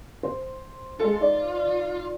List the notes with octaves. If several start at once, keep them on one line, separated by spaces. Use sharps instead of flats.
C5
G#3 F4 A4
D#4 D5